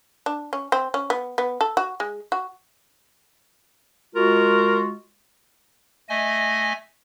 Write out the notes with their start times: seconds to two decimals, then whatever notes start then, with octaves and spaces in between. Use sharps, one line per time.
0.26 D4
0.53 C#4
0.72 C4
0.94 C#4
1.10 B3
1.38 B3
1.61 A4
1.77 F#4
2.00 G#3
2.32 F#4
4.16 G#3 F4 F#4 A#4
6.09 A3 D#5 G#5